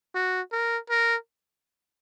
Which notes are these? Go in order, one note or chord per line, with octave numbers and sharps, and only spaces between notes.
F#4
A#4
A#4